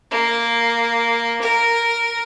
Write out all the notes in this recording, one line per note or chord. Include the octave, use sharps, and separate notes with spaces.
A#3
A#4